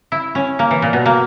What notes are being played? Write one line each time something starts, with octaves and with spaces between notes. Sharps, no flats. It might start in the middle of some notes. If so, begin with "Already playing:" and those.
E4
C#4
A#3
E3
A#2
B2
A#3